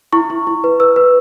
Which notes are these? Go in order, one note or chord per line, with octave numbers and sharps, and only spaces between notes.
E4 C#6
E4
E4
B4
B4 E6
B4